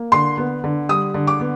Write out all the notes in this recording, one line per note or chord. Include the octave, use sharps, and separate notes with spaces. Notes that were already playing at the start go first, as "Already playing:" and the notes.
Already playing: A#3
D3 C6
B3
D3
G3 D#6
D3
D6
B3